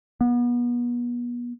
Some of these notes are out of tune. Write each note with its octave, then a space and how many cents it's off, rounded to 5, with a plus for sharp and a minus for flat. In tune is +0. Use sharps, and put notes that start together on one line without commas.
B3 -35